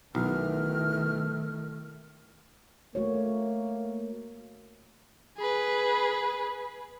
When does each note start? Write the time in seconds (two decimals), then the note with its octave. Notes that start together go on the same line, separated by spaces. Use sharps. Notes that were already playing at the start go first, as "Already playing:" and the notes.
0.15 B1 D#3 E3 A3 F6
2.95 A3 A#3 F#4 C#5
5.37 G#4 B4